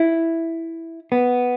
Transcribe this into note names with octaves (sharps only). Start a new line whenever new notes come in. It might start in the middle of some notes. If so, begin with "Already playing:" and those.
Already playing: E4
B3